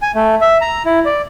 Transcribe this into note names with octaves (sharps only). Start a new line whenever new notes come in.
G#5
A3
E5
A#5
E4
D5